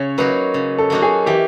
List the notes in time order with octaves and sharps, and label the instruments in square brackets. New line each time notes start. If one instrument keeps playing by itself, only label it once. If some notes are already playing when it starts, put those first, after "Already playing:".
Already playing: [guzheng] C#3 [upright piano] C#5
[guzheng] F#3 A#3 D#4 F#4 [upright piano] B4
[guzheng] C#3
[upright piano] A4
[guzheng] F#3 A#3 D#4 F#4
[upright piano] G#4
[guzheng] E3 [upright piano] G4